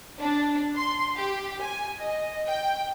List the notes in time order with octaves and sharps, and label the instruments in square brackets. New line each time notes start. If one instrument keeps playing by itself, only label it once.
[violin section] D4
C6
G4
G#5
D#5
G5